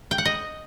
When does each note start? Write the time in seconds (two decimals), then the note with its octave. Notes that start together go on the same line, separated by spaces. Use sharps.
0.11 G5
0.18 F#5
0.25 D#5